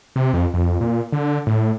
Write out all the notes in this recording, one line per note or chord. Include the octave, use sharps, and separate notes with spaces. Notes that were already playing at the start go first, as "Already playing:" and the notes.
C3
F2
F2
A#2
D3
A2